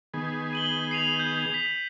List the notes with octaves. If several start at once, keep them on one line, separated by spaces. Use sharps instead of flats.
D#3 B3 G#4
D#7 F#7 G7
C7 D#7 F7
G6
B6